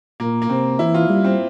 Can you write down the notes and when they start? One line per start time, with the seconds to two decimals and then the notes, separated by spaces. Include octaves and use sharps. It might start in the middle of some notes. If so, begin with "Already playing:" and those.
0.20 A#2 A#3
0.42 A#3
0.50 C3 C4
0.79 E3 E4
0.94 F4
1.09 G3
1.25 C4